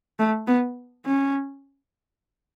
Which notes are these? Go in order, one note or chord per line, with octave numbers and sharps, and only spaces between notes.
A3
B3
C#4